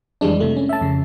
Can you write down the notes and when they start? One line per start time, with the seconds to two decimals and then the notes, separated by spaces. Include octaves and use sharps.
0.21 F2 E3 G3 G#3 D4
0.40 C3 A3
0.57 C#4
0.69 E5 A5
0.81 F2 C#3